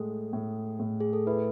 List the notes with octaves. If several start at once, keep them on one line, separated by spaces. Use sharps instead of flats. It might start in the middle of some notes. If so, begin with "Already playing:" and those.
Already playing: A2 G#3 A4
A2
A2
G#4
A4
E4 B4